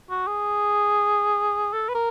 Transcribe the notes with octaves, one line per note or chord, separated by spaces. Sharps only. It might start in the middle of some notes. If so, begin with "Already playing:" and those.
F#4
G#4
A4
B4
A#4